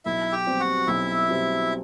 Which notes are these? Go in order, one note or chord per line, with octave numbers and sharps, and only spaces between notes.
B1 E4 E5
G4 G5
B2 G3 C4
F#4 F#5
B1 E4 E5
B2 G3 C4